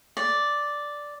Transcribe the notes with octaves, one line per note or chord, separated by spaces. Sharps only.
D5